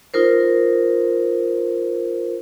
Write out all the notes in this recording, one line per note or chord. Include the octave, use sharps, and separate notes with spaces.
D#4 F4 A#4 C5